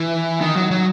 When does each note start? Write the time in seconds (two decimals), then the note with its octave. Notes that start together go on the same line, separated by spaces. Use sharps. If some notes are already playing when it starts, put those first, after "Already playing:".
Already playing: E3
0.41 D#3
0.56 F#3
0.71 F#3